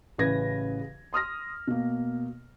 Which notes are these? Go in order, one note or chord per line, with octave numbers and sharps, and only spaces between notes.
A1 C#3 E3 B4 G#6 A#6
C6 D#6 F6 A#6
B2 A#3